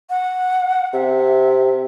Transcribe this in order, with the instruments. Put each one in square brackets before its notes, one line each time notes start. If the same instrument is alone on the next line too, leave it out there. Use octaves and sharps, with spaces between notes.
[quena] F#5
[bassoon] C3 [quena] E5